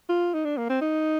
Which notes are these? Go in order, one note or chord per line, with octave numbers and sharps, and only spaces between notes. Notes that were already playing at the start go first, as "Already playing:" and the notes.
F4
D#4
D4
A#3
C4
D#4